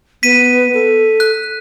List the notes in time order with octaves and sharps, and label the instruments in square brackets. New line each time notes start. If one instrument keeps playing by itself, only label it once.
[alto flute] B3 [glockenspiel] B6 D#7
[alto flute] A4
[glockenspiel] F#6